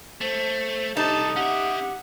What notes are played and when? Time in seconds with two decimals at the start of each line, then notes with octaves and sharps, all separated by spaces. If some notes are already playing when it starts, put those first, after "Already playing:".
0.21 A3 C5
0.97 C2 D#4 G4 A4 A5
1.36 C#4 G4 E5 F#5